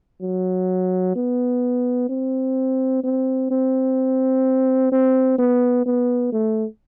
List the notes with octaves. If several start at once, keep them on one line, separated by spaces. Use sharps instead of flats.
F#3
B3
C4
C4
C4
C4
B3
B3
A3